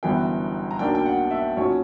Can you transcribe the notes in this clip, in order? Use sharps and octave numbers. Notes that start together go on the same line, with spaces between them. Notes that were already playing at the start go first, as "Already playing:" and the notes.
G1 F#2 E3 B3 G5
A#5
B1 B2 A#3 D4 G5
G5
F#5
E5
B1 A#2 F#3 C#4 C#5